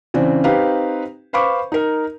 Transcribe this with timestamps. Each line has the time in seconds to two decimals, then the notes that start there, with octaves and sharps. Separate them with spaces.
0.14 C#3 E3 C4 D4
0.44 C4 D#4 G4 B4 F5
1.33 B4 C5 F5 B5 C#6 D6
1.72 D#4 A#4